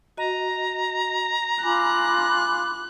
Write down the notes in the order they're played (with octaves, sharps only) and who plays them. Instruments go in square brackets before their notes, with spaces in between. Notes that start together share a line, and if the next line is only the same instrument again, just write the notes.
[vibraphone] F#4 D#5 [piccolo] A#5
[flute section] F4 B5 D6 [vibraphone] G#5 [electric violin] F#6